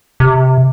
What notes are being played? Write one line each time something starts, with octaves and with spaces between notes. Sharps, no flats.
C3